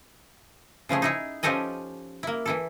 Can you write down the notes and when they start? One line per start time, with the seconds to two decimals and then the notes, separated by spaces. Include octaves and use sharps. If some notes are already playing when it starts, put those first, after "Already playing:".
0.89 C#3 F3 A3 G#4
1.02 D#4 E4 G#4
1.43 F3 C#4 G4 A4 D#5 G#5
2.23 A#3 E4
2.46 E3 E4 A4